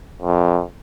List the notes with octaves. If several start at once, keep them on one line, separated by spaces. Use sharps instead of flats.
F2